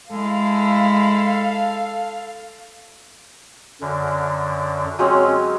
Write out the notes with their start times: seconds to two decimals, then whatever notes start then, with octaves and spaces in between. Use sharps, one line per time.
0.11 G#3 E4 A4 F5
3.81 F#2 D3
4.99 F#3 G#3 C4 C#4